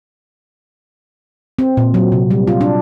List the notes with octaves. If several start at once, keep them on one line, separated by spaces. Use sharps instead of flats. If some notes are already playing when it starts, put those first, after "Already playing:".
C4
A#2
F#3
C3
G3
F4
D4